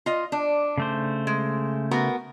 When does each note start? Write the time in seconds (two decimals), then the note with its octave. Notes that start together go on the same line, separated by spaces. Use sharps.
0.06 F4 D#5
0.32 D4
0.78 C#3 A3 C5
1.27 G#3
1.91 B3 F#4 A#4